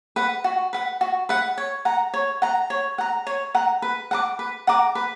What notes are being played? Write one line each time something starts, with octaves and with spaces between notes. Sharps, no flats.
B4 F#5
F#4
B4 F#5
F#4
B4 F#5
C#5
F#5 A#5
C#5
F#5 A#5
C#5
F#5 A#5
C#5
F#5 A#5
B4
F#5 A#5 D6
B4
F#5 A#5 D6
B4